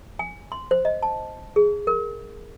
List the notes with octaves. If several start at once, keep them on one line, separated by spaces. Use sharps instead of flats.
G#5
C6
C5
D#5
A5
G#4
A#4